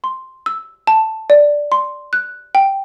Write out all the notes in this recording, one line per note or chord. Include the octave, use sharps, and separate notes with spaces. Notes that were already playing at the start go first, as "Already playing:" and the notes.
C6
E6
A5
D5
C6
F#6
G5